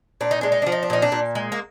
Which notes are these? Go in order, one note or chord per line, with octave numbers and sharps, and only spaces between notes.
A#2 D4
D#4
G#3 D4
D#4
F3 D4
D#4
D4
A#2 D#4
D4
A#2
G#3
A#3